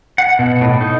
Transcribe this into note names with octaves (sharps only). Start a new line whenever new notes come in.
F#5
B2
A2
D#4